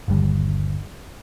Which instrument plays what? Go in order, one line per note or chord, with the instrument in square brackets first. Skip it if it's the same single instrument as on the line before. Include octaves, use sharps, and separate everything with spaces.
[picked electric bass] G1 D#2 D3 G3